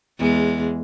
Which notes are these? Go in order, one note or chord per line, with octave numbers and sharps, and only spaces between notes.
E2 G#3